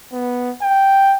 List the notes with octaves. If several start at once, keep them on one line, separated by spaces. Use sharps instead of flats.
B3
G5